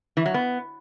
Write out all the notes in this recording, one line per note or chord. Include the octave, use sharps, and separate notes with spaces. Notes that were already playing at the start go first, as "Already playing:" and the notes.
E3
F#3
B3